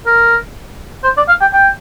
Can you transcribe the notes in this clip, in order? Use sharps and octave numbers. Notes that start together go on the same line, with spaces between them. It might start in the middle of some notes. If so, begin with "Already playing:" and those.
A#4
C5
D5
F5
G5
G5